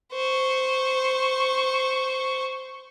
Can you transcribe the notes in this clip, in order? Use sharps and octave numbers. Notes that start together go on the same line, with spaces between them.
C5 C#6